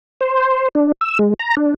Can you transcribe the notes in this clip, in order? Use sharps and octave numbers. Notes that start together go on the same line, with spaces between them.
C5
D4
E6
G#3
A#5
D4